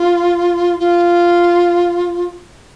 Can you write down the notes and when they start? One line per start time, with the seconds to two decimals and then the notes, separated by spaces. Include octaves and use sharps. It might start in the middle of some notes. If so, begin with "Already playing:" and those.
Already playing: F4
0.79 F4